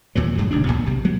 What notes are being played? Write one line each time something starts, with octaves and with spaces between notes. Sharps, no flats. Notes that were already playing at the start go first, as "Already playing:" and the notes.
D#2 A#2 E3 F#3
F#2 A2 C#3 F#3
D1 D#2 C3 D4
G#1 E2 A#2 B3
B1 C3
F#3 G#3 B3